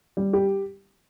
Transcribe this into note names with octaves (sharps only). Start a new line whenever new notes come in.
G3
G4